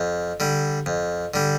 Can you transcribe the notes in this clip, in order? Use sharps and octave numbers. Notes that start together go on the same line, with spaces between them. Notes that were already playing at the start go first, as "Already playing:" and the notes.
Already playing: F2
D3 G3
F2
D3 G3